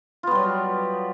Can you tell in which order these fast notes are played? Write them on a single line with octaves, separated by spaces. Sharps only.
F4 B3 G3 F#3